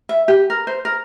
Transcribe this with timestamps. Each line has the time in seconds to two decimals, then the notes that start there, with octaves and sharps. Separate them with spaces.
0.09 E5
0.28 G4
0.50 A#4
0.67 C5
0.85 A#4